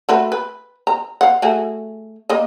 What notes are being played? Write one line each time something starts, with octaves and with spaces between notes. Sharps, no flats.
A3 F#4 B4
B4
A#5
F5 F#5
A3 F#4 G#4
A#3 D#5